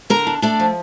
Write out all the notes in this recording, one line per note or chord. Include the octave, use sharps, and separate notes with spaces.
D3 A#4 A#5
D4
A3 D4 D5
F3